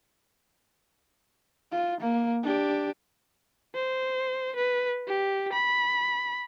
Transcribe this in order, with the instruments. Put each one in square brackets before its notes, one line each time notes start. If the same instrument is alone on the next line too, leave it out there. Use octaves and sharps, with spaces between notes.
[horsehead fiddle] F4
A#3
D4 G4
[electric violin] C5
B4
G4
B5